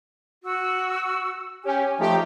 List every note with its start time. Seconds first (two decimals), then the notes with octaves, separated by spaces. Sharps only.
0.44 F#4 E6
1.64 C#4 G4 G#5
1.98 F3 A3 D#4 G4 E5 A#5